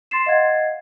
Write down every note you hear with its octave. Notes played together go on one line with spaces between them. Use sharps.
C6 A6 C7 E7
D#5 F5 F#5 G#6 A6 C7